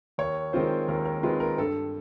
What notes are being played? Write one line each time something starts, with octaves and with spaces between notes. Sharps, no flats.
D#2 C#5
D#3 G#3 C4 F4 C5
D#2 A#4
A#4
D#3 G#3 C4 F4 B4
A#4
G2 A4